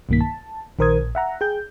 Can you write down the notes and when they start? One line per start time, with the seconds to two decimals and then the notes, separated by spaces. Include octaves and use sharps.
0.09 B1 G2 D#3 A#3 B6
0.21 A5
0.79 A#1 D#3 A#4 C5 D#6 G#6
0.99 A#1
1.15 E5 F#5 A#5
1.41 G#4 G5 G6